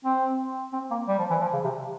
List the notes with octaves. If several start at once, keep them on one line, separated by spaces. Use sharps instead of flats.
C4
C4
A#3
G3
F3
E3
F3
C#3
C3